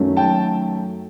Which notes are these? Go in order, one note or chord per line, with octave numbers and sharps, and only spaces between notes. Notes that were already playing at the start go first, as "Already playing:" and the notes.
Already playing: F#2 D#3 F#3 A3 C#4
G5 A5